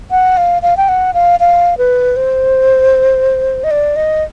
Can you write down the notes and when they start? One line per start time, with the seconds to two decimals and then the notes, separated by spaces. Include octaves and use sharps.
0.11 F#5
0.37 F5
0.62 F5
0.77 G5
0.89 F#5
1.14 F5
1.40 F5
1.78 B4
2.16 C5
3.64 D#5
3.71 D5
3.96 D#5